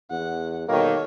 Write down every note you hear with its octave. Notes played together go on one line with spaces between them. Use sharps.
E2 F#5
B2 D#3 G3 A#3 A4 C#5